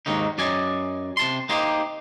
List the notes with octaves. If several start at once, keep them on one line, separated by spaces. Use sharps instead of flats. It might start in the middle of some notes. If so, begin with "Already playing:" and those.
D#2 G#2 D#3 A#3 D#4
F#2 F#3 D5 D#5 G#5
C3 A5 C6
A#3 D#4 G4 C5